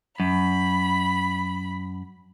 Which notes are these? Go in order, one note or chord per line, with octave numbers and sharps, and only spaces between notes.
F#2 B5